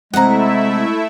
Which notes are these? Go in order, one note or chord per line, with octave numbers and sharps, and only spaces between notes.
C3 G#3 A3 E4 D#5 E5 F#5 A#5